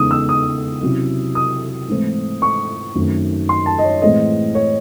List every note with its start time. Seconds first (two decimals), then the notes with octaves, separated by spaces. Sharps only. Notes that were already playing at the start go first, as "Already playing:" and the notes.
Already playing: E2 C#3 E3 G#3 D#4 D#6
0.11 E6
0.29 D#6
0.82 C3 F#3 C#4 E4
1.35 D#6
1.88 G#2 E3 A3 C4
2.42 C#6
2.95 F#2 D#3 A3 C4 D#4
3.49 C6
3.66 A5
3.79 D#5
3.84 C#5
4.02 A2 E3 G#3 C4 D#5
4.55 C#5